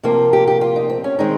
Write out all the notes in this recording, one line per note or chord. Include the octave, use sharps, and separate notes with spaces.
C3 F3 A#3 F4
G4
G4
F4
D#4
C4
C#4
D#3 G#3 C4 D#4